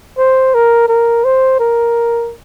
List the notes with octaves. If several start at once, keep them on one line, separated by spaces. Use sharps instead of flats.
C5
A#4
A#4
C5
A#4